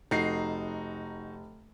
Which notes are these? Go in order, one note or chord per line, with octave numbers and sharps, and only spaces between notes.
F1 D#4 F#4 C7